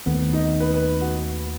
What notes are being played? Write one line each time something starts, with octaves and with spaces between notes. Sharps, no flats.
D#2 D#3 A3 B3 C4
D#4
B4
B4
F#4